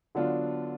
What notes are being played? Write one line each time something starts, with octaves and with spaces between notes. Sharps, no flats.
D3 F#3 B3 D4 F4